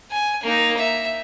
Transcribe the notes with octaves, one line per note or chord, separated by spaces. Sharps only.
G#5
A#3 D#4
E5